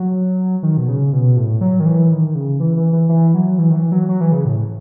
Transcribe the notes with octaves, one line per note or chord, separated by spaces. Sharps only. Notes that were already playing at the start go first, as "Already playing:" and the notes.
Already playing: F#3
D#3
B2
C#3
B2
A2
F#3
D#3
E3
D#3
C#3
E3
E3
E3
E3
F#3
E3
D#3
E3
F#3
F#3
E3
C#3
A2